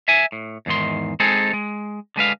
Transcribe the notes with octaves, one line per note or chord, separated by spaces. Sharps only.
E5 G#5
A2
E2 G#2 D#3 C6
G#3 C4 D#4 G#4 A4
G#3
D3 G#3 B4 F5